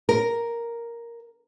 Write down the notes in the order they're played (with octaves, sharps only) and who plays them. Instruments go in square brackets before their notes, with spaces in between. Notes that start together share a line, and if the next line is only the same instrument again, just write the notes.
[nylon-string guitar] A#4